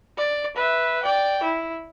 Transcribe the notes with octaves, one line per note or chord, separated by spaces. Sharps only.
D5
B4 E5
D5 G5
E4